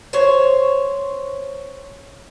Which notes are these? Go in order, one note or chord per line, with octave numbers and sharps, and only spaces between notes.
C5 C#5